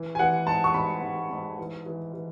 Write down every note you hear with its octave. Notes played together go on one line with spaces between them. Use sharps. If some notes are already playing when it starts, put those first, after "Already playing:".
Already playing: E3
G#5
E3 F#5
G#2 A5
C#6
G#2 B5
G#2
G#2
E3
E3
E3